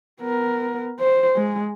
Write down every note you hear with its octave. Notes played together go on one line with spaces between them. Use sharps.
B3 A#4
C5
G#3